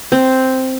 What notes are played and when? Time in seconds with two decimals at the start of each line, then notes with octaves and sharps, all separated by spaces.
0.12 C4